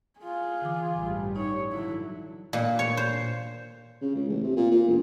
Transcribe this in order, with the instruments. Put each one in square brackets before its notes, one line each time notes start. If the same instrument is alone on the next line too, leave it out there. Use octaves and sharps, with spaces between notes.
[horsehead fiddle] F4 G#4
[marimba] D3 E3 D6
[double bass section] A1 G2 G3
[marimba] D#4 [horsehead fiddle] C#5
[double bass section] D3 F#3 [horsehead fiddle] E4
[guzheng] A#2
C#5
C5
[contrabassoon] C#3
C#2
A1
C3
A#2
A#2
E1